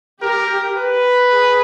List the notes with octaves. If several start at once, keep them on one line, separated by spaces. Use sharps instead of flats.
G4 A#4
B4
G#4